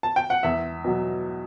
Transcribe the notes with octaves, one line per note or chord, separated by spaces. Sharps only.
A5
G5
F#5
E2 E5
B2 F#3